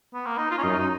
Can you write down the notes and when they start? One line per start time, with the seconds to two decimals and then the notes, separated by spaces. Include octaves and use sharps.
0.14 B3
0.26 A#3
0.38 D#4
0.51 F4
0.58 C#4
0.63 F#2 D#4
0.79 D#4